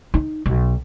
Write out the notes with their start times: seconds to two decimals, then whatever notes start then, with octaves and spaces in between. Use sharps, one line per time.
0.14 D#4
0.46 B1